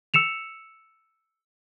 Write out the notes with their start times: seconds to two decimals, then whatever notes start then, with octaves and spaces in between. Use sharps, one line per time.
0.14 E6 C#7 E7 F7